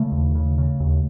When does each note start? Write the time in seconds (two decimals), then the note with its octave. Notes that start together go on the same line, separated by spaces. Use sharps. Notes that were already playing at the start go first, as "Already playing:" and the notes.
Already playing: C#3 A3
0.12 D#2
0.35 C#3
0.58 C#3
0.80 D#2